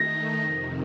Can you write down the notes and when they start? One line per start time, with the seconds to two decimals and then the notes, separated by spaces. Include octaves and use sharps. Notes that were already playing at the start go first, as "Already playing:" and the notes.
Already playing: D#3 A3 D#4 A#6
0.41 F2 C3 D#3